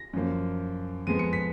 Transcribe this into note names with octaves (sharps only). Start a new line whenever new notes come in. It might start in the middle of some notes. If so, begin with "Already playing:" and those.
Already playing: A#6
F#2 F3 A#3
F2 F3 G#3 B3 D#7
C#7
B6